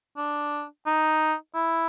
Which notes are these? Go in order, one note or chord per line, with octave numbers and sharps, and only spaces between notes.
D4
D#4
E4